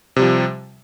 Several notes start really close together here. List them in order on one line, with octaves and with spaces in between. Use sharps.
C3 G3 F3